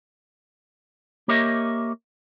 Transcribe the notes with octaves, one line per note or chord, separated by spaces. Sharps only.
A#3 G4 A#4 C#5 D#5 E5